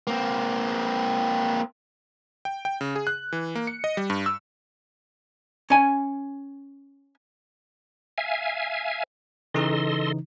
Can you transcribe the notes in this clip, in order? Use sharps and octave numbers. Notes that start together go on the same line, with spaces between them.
A#3 C4
G5
G5
C#3
G#4
F#6
E3
A#3
C#7
D#5
G3
G2
E6
C#4 G#5
E5 F5 G#5
C#3 E3 D#4 A4 D#5 C6